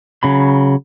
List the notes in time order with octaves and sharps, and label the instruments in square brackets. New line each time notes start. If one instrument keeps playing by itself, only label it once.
[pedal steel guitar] C#3 F#3 B5